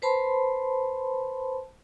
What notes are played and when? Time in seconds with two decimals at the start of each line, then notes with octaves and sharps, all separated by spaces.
0.02 B4 C5 A5 B5 C6